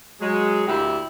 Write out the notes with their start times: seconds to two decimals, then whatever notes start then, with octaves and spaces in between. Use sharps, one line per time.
0.21 F#3 G#3
0.67 D2 A#2 E4 G4